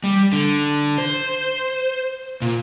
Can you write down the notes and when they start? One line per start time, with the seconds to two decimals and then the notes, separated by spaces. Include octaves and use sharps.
0.04 G3
0.33 D3
0.98 C5
2.42 A#2